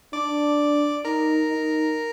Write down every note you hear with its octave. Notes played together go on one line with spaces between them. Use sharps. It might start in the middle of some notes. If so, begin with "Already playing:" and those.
D4 D5 D6
D#4 A#4 A#5
D#4